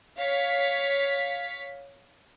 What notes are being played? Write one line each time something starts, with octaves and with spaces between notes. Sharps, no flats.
C#5 F5 B6